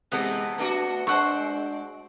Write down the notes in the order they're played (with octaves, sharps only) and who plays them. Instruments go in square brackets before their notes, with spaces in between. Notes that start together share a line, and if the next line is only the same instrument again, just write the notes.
[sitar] C3 E3 A4 [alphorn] G#3 [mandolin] B3
[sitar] A3 D4 F#4 [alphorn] B4
[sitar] G#3 [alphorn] D4 [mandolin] C5 F#5 C#6